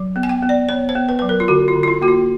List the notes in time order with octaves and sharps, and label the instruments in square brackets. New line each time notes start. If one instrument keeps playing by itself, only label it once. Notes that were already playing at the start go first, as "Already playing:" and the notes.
Already playing: [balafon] F#3
B3
G#5
G5
B3
D5
B3 C#5
C5
B3
B4
F#3 B4
A#4
F4
D3 F#4
F4
D3
F4
E4
A#3 F#4
F4